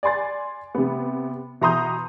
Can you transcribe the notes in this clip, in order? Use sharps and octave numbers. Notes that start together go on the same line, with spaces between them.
D5 G#5 C6 A6
C3 B3
B2 E3 A#5 C6 D#6 G6